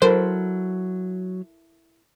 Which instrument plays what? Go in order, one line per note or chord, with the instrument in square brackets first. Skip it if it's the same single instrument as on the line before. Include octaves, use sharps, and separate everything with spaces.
[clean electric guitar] F#3 [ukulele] E4 A4 A#4 [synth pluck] C5